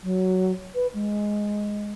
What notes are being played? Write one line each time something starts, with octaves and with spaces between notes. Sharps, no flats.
F#3
B4
G#3